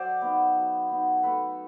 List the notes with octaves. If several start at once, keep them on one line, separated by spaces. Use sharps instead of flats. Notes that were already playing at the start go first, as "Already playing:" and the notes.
Already playing: F#3 C5 D5
B3 D#4
F#3
B3 D#4
A3 A4 B4